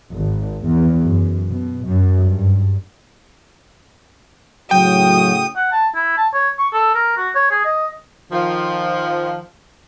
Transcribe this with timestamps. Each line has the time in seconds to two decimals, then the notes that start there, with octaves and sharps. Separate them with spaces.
0.15 G#1
0.67 E2
1.05 F#2
1.46 B2
1.84 F#2
2.22 G2
4.71 A2 C#3 F#3 F#4 G5 D#6
5.56 F#5
5.72 A5
5.95 E4
6.17 A5
6.33 C#5
6.59 C#6
6.73 A4
6.95 A#4
7.17 F#4
7.35 C#5
7.51 G#4
7.65 D#5
8.32 D#3 F3